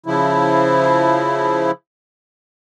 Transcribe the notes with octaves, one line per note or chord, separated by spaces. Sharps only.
C#3 F3 E4